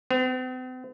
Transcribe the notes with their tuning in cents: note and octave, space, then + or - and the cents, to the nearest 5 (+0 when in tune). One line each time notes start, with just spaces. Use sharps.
C4 -45